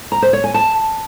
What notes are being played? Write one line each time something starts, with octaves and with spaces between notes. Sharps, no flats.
A#5
C5
C#5
G#5
A5